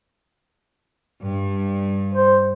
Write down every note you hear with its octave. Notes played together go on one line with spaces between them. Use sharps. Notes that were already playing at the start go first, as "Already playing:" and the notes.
G2
C5